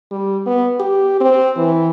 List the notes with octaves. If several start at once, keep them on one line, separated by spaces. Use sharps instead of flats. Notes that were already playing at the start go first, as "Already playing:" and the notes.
G3
B3
G4
C4
E3